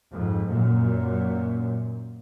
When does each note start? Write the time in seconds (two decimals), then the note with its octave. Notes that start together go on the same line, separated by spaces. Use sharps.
0.12 F2 G#2
0.49 F#2 A#2